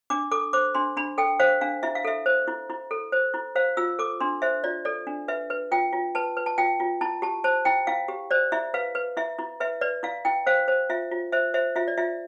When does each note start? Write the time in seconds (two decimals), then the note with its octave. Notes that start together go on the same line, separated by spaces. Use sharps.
0.10 D4 D6
0.31 A4 D6
0.53 C5 D6
0.75 D4 C6
0.97 D4 B5
1.18 A4 G5
1.39 C5 F5
1.61 D4 F5
1.83 E4 E5
1.95 F5
2.05 A4 E5
2.26 C5
2.48 E4
2.70 E4
2.91 A4
3.12 C5
3.34 E4
3.55 C5 F5
3.77 F4 E6
3.99 A4 D6
4.20 D4 C6
4.42 C5 E5
4.64 F4 D5
4.85 A4 D5
5.07 D4
5.28 B4 E5
5.50 B4
5.72 F4 G5
5.93 F4
6.15 B4 A5
6.37 B4
6.46 A5
6.58 F4 G5
6.80 F4
7.01 E4 A5
7.22 G4 A5
7.44 C5 A5
7.65 E4 G5
7.87 E4 F5
8.08 G4
8.31 C5 D5
8.52 E4 E5
8.74 B4 F5
8.95 B4
9.17 E4 E5
9.39 E4
9.60 B4 E5
9.81 B4 D5
10.03 E4 F5
10.25 E4 G5
10.46 C5 F5
10.68 C5
10.89 F4 E5
11.12 F4
11.33 C5 E5
11.54 C5 E5
11.76 F4 E5
11.88 D5
11.98 F4 E5